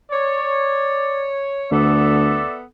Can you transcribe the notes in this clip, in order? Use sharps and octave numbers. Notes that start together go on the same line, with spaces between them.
C#5 D5
D2 B3 A4 D5 E5